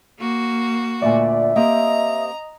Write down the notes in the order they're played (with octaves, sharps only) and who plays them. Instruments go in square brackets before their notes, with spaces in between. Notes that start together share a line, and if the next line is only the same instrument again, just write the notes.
[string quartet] A#3 F#4
[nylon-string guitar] D2 A#2 G#5 [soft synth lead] D5 [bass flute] E5
[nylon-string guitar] A#3 C4 G4 [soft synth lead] D#5 [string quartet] A#5